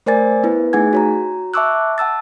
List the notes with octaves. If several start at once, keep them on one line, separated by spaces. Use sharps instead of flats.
A3 A#4 C5 D5 G#5 A6
B3 E4 B4
A3 D#4 G#4 F#5 G#5 G#6
F#4 C#5 A#5
E5 A5 C#6 D6 E6 F#6
F#5 A5 E6 A6